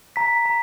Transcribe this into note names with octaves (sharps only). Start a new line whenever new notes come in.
A#5 B6
A#5